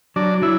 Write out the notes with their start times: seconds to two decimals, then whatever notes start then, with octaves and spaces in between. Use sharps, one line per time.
0.16 F#3 D4
0.42 F#3 E4